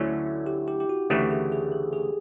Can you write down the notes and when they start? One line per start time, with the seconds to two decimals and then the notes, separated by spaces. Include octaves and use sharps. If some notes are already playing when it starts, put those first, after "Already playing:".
Already playing: D2 D3 F#3 A3 C#4 E4
0.46 G4
0.68 G4
0.80 G4
0.89 F#4
1.10 D2 C#3 E3 A3 G4
1.31 G#4
1.52 G#4
1.72 A4
1.93 G#4